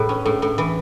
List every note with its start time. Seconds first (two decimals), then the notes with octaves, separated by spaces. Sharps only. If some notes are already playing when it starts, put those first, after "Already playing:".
Already playing: A2 B4
0.09 C#4
0.26 A2
0.42 A2
0.58 E3